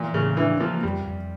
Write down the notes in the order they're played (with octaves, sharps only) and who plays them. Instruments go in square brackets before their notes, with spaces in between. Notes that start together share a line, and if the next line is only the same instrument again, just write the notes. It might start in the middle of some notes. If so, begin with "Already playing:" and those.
Already playing: [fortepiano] A#2 [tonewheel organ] E3
[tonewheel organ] A2 [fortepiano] C#3
[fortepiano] E3 [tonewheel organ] D4
[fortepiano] F3 [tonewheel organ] A#3
[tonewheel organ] F2 [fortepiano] G3
[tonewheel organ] F2